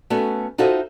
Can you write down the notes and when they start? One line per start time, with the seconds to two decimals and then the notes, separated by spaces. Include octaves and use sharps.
0.10 A3 B3 C#4 F#4
0.58 D#4 F4 F#4 A4 C5 E5